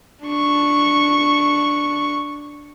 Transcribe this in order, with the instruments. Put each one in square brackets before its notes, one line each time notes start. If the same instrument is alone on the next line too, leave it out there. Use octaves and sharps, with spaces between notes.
[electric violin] D4 C#6